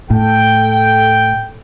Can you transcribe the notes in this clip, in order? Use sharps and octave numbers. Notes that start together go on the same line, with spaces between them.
A2 A4 G5